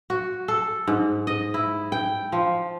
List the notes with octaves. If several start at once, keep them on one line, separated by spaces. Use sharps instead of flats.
F#4
A4
G#2
D#5
E4
G5
F3